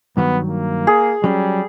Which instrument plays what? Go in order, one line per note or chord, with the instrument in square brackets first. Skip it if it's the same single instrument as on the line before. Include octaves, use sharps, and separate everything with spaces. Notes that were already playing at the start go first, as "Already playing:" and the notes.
[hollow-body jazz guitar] G2 D#3 F#3 [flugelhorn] B3
[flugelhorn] A#3
[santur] G#4
[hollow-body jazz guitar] F#3 C#4 [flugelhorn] G3